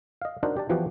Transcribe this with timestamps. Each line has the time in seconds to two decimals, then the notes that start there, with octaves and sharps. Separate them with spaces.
0.22 D#5 F5
0.43 D4 D#4 F#4 A#4 C5
0.57 G4 D5 A5
0.69 E3 F3 B3 F#4 G4